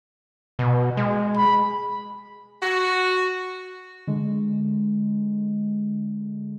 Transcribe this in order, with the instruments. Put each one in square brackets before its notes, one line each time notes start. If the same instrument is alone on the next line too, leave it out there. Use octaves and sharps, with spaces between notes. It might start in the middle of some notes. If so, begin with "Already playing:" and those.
[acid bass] B2
G#3
[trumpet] B5
[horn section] F#4
[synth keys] D3 G#3